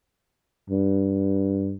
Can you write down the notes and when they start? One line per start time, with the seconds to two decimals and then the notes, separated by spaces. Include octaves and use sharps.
0.70 G2